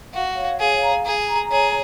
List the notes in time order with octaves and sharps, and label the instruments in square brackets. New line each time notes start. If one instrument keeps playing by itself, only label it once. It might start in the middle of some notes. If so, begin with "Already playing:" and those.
[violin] F#4 [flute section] F5
[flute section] C#5
[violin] G#4 [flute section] F5
[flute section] A#5
[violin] G#4 [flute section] A#5
[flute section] A#5
[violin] G#4 [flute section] C#5